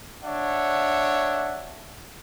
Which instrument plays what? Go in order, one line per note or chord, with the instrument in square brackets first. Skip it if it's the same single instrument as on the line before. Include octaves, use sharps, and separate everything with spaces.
[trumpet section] D4 C#5 E5 F#5